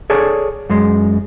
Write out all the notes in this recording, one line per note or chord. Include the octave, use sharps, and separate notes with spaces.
G#4 A4 C#5 D5
F#2 G#3